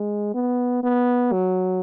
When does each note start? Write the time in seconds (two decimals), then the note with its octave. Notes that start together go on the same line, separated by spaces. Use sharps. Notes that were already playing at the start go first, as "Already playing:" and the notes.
Already playing: G#3
0.34 B3
0.83 B3
1.32 F#3